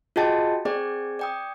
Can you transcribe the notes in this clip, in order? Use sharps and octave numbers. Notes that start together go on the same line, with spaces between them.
F4 F#4 G#4 D#5 G5 A5
C4 G#4 D5 G5
D5 G5 D#6